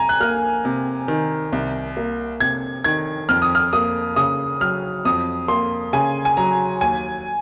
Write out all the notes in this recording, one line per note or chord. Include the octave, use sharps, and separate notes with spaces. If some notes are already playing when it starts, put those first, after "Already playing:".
Already playing: C2 G#5 A#5
F#6
A#3 F6
C3
D#3
C2
A#3
C3 G#6
D#3 G#6
F2 F6
D#6
F6
A#3 D#6
C#3 D#6
F#3 F6
F2 D#6
A#3 C6
C#3 G#5
G#5
F#3 A#5
D#2 G#5